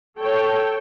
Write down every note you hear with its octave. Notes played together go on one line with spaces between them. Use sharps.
A4 C#5 G5